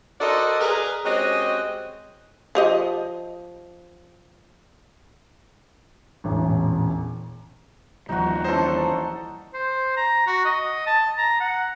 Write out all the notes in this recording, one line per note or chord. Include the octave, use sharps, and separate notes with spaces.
F#4 A4 A#4 C5 D5 D#5
G#4 A#4 B4
G#3 C4 C#4 F#4 G4 D#5
F3 G4 D#5
E1 A1
A#2
D#2 F3 G3 D#4 F#4
E3 C#4 A4 C5 D#5
C5
A#5
F#4
D#5
A5
A#5
F#5